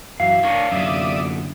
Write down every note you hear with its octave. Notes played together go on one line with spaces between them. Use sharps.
F#2 E3 F5
D4 A#4 C#5
F#2 D3 D5 E5 D#6